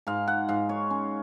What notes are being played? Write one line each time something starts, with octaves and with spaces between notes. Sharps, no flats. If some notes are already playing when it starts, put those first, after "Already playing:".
G#2 F5
F#5
G#2 F5
C#5
C#4